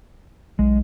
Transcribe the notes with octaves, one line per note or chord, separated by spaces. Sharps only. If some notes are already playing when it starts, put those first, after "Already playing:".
B1 G#3